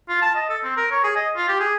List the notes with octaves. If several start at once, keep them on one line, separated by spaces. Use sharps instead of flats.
F4
A5
D#5
A4
C4
A#4
C#5
G#4
D#5
F4
G4
G#4